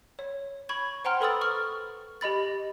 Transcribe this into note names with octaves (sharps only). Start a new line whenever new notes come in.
C#5
B5 C#6 G#6
C5 F#5 G5 A#5 C6 F6
A4 B4 B5 D#6 E6 A6
C#6 F6
G4 D#5 B5 A6